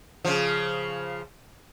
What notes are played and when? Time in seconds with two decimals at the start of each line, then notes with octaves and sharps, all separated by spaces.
0.25 C#3 F3